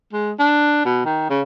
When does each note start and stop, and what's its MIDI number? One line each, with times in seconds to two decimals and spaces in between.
0.13 0.31 56
0.40 0.85 62
0.85 1.03 47
1.05 1.30 51
1.30 1.42 49